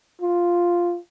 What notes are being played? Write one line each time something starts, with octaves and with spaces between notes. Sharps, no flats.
F4